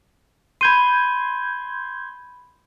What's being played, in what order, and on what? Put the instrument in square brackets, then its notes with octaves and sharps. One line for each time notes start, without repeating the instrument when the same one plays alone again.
[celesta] B5 D#7 [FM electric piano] C6 G6 G#6